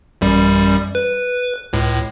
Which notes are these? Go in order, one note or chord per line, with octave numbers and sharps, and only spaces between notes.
A1 F#2 G3
B4
C#2 A2